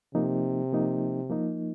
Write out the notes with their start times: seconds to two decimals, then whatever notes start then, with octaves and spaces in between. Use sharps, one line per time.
0.15 C3 F3 A#3 D#4
0.73 F3 A#3 D#4
1.30 F3 A#3 D#4